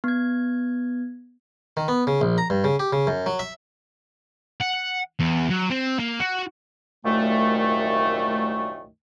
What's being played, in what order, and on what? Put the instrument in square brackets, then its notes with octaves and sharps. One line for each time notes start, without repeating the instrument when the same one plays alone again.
[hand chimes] B3 G#6
[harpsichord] D#3
B3
C#3
A#1
A#5
G2
C#3
G4
C#3
F#2
F#3
E5
[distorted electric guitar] F#5
E2
F#3
C4
A#3
F#4
[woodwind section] C2 F#2 A#2 D#3 A3